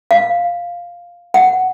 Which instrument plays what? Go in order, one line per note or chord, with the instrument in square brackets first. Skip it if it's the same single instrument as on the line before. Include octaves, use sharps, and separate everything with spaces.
[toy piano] F5
F#5